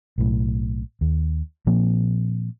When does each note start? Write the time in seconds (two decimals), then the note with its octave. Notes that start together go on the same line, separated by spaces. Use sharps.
0.18 B1 A2
1.01 D#2
1.67 A#2 F3 A#3 C4